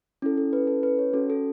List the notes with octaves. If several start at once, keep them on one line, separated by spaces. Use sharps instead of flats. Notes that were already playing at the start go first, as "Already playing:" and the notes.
C#4 E4 A4
A4
B4
A4
B4
C#5
C#4 F#4 A4
A4